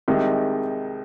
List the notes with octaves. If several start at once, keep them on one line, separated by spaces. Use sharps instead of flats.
C2 C3 D#3 G#3 D#4